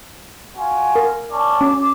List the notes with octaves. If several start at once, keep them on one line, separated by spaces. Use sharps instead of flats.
F4 F#4 G#5
A#4
C#4 D5 A5
C#4 D6